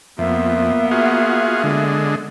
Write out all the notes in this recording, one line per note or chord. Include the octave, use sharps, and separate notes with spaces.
F2 A#3 B3 E5
F4 F#4 G#4
D3 G#3